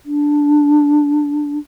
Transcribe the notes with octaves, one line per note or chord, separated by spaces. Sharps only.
D4